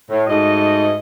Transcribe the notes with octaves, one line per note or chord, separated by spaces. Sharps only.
A2
G#2 A3 F#4 D#5